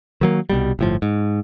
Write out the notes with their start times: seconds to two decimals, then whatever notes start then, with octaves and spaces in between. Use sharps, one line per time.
0.21 D#3 F#3 A#3
0.50 C2 B2 G3
0.79 G1 A2 F3
1.02 G#2